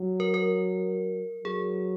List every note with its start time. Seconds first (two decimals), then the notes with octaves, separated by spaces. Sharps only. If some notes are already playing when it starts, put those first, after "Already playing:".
Already playing: F#3
0.20 A#4
0.34 A#4
1.44 F#3 G#4